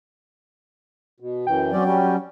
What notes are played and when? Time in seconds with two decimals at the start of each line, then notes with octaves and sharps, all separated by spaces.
1.20 B2
1.47 F#2 E3 G5
1.72 F#3 C4 C#4 D5
1.86 G3 C#4